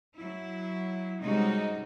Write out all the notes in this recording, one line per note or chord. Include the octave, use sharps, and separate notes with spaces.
F#3 E4
C3 G3 G#3 C#4 D#4 F#4